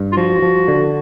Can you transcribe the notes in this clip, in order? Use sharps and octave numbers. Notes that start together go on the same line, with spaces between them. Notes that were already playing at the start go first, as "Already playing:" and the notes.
Already playing: G2
F4
F3 F#4
F3
D3